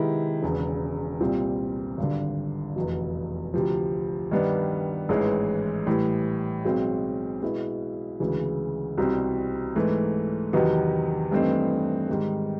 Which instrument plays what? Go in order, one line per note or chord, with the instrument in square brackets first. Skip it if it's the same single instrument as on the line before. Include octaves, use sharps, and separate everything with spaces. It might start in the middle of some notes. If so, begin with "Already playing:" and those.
Already playing: [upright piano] C3 D#3 G#3 B3 E4
E1 E2 C#3
C2 A#2 G3 C4 F4
G#1 G2 D3
F1 E2 B2
D2 C3 F3
G2 D#3 G3 B3 D4
A1 G#2 E3 G#3
A2 E3 G3
B1 B2 G#3 C4
B2 G#3 B3 E4
D2 C#3 E3 G#3
C2 B2 G3 C4
G#2 E3 A3
E2 C3 D#3 F#3 B3
G2 E3 A3 C4 D#4
G#2 D#3 G3